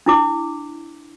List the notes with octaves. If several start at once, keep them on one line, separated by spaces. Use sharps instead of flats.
D4 E4 D6